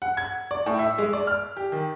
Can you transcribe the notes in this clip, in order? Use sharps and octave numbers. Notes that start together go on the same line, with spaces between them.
F#5
G#6
D5
A2
E5
G#3
D5
F6
G4
D#3